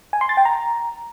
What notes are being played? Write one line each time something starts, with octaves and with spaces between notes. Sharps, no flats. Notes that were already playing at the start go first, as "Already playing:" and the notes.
G#5
C6
A6
G5
A#5